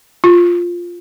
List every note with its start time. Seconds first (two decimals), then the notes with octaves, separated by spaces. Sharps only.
0.24 F4